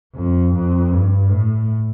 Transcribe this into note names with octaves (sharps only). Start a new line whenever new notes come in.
F2
F2
G2
A2